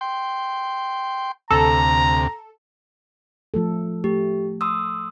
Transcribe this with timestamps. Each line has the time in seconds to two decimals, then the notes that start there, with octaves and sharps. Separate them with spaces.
0.01 G5 C6
1.50 D2 C3 A4 A#5
3.54 F3 A3 A4
4.04 A3 G4
4.61 C6 D#6 E6